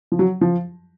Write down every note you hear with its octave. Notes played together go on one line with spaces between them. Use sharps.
F3
F#3
F3